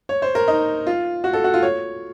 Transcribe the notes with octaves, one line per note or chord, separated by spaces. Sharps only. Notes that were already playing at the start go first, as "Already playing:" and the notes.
C#5
C5
A#4
D#4
F4
F#4
A4
F#4
F4
C#5